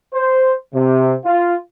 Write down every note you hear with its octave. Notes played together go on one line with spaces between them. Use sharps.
C5
C3
F4